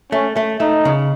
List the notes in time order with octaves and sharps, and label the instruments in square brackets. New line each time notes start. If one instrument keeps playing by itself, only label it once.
[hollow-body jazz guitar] A3 [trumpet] C#4
[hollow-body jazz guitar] A3
[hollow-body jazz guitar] A3 [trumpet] D#4
[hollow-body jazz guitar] C#3